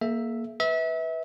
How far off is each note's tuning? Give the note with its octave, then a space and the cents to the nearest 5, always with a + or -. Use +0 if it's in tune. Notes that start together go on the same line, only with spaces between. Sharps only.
A#3 +0 G#4 +45 E5 +0
B4 +0 E5 -30